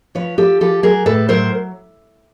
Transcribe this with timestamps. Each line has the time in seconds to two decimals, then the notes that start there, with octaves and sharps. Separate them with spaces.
0.15 F3 B4 C#5
0.38 F3 G4 A4
0.61 F3 G4 A4
0.83 F#3 G#4 A#4
1.06 A2 A4 B4
1.29 F#3 A#4 C5